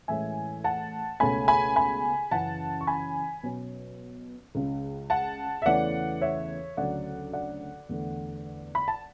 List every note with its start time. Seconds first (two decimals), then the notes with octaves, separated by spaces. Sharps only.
0.08 A2 E3 G#3 C#4 E5 G#5
0.64 F#5 A5
1.20 C#2 B2 A3 C#4 G#5 B5
1.48 G#5 B5
1.76 G#5 B5
2.31 F#2 C#3 E3 F#5 A5
2.81 C#6
2.87 G#5 B5
3.43 B2 F#3 C#4
4.55 C#2 C#3 G#3
5.10 F#5 A5
5.62 E5
5.66 E2 C#3 E3 A3 C#4 D5 F#5
6.21 C#5 E5
6.77 D2 C#3 F#3 D5 F#5
7.33 D5 F#5
7.89 E2 D3 A3
8.75 B5
8.88 A5